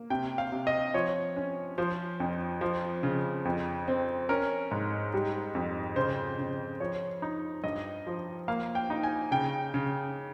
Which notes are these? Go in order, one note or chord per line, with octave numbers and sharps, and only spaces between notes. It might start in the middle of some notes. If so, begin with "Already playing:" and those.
Already playing: A#3
C3 G5
F5
C3
D#5
F3 C#5
C#4
F3 C5
F2
F3
C#3
F2
C4
C#4 A#4
G#2
G3
F2
C#3 C5
C#3
F3 C#5
D#4
G2 D#5
F3
A#3 F5
G5
D#4
G#5
C#3 G5
C#3